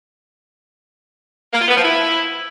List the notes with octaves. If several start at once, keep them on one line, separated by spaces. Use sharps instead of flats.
A#3
F4
B3
F3
E4